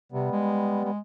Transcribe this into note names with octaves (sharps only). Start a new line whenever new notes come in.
C3 G3 B3
G#3
G#3